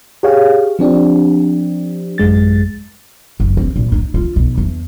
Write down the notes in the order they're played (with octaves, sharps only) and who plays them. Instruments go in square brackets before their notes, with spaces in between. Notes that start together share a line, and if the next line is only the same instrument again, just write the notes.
[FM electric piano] G4 G#4 C#5 F5
F3 C4 D4 G4
A1 F#2 G#3 A6
[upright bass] F#1
C4
A#1
D#4
F4
B1
E2